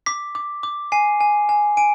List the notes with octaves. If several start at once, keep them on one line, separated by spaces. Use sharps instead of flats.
D6 B6
D6
D6
G#5 C7
G#5
G#5
G#5 D7